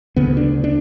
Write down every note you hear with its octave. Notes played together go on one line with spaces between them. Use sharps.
D2 C#3 B3
D4
D4